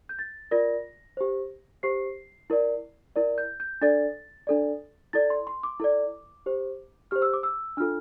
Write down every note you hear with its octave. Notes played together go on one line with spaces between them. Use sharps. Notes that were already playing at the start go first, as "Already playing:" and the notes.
G6
A6
F4 A#4 D5 A#6
G4 C5
G4 C5 C7
E4 A#4 D5
E4 A#4 D5
G6
G6
D4 A4 D5 A6
D4 A4 D5
E4 A4 D5 A6
C6
C6
D6
E4 A4 D5
G4 C5
G4 C5 F6
E6
D6
E6
D4 F4 A4 F6